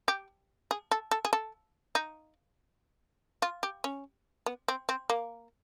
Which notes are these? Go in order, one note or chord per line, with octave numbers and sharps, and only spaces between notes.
G4
G#4
A4
A4
G#4
A4
D#4
F4
G4
C#4
B3
C4
C4
A#3